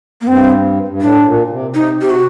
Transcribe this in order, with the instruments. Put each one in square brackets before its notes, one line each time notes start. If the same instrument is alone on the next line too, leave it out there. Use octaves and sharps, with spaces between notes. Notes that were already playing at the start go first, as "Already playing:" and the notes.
[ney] A#3
[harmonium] G2 [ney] C4
[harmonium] G2
[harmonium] A2 [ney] D4
[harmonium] A#2
C3
[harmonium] C3 [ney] D#4
[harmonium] C3 [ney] G4
[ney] F#4